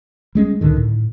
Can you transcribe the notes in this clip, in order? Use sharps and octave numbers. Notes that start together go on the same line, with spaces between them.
G3 G#3 C#4
C#2 A2 D3 D#3
A2